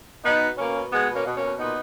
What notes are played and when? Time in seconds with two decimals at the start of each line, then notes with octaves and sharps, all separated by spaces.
0.24 B2 B3 D#4
0.41 B2
0.58 B2 A#3 C#4
0.75 B2
0.91 B2 G#3 B3
1.09 B2
1.14 A#3 C#4
1.25 B2
1.36 A#3 C#4
1.43 B2
1.59 A#2 B3 D#4